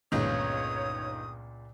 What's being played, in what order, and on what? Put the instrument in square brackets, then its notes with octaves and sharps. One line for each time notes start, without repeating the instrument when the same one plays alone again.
[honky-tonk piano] G1 D#3 [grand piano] C#2 A#2 G#3 [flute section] C#5 [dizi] D#6